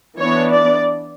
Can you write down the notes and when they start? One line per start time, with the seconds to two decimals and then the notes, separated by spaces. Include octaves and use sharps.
0.19 E3 B3 D4 C#5
0.53 D5